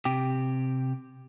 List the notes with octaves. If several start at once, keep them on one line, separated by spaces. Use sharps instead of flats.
C3 G4